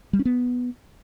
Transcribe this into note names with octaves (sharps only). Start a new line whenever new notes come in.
G3
C#4
B3